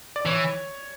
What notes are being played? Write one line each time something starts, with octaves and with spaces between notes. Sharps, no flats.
D5
E3 C#5